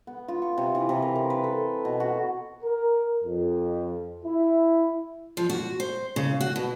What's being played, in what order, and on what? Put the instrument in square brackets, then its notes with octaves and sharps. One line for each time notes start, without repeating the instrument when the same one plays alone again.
[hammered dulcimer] B3
F4
C#6
C3
E3
C3
A#4
A#4
B4
A4
B2
F#4
[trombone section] A#4
F2
E4
[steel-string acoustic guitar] F3
F#4
C5
C#3
F#4
B2